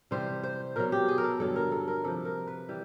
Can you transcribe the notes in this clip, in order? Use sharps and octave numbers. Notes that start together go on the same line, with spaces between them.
C3 E3 G3 C5
C5
B2 F#3 A#4
G4
G#4
A#4
A4
G2 D3 F#3 A4
A#4
A4
A#4
C3 F3 A4
A#4
B4
E3 G3